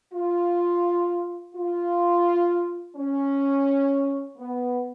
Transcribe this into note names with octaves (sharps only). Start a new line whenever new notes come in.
F4
F4
C#4
B3